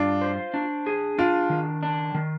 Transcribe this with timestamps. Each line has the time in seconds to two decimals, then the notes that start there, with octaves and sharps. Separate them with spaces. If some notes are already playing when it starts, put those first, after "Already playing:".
Already playing: G2 D4 F4
0.21 C5
0.54 D4
0.86 G#4
1.18 D4 F4
1.50 D#3
1.83 D4
2.15 D#3